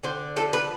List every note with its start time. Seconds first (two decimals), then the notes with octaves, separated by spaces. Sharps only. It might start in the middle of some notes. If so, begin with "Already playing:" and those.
0.04 D3 C5
0.36 F3 A4
0.53 B4